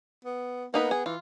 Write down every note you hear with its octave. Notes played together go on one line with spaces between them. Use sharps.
B3
A#3 B3 D#4 B4
G#4
E3 F4